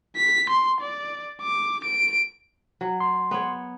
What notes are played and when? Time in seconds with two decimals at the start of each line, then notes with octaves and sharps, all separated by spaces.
0.16 B6
0.50 C6
0.81 D5
1.41 D6
1.84 D7
2.81 F#3
3.00 C6
3.31 B3 C#5